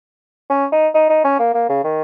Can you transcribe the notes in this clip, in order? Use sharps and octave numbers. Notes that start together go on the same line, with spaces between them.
C#4
D#4
D#4
D#4
C#4
A#3
A#3
C#3
D#3